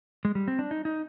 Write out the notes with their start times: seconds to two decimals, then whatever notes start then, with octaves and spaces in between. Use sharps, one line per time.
0.25 G#3
0.35 G3
0.48 C4
0.59 D4
0.71 D#4
0.85 D#4